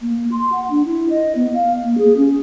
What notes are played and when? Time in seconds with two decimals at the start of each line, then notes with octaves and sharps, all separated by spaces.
0.01 A#3
0.32 C6
0.52 F#5
0.70 D4
0.86 E4
1.10 D#5
1.35 B3
1.54 F5
1.83 A#3
1.98 G#4
2.17 C#4